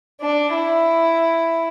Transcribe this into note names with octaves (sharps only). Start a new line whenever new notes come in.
D4
E4